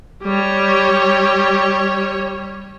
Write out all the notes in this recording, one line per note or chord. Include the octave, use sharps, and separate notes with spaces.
G3 C#5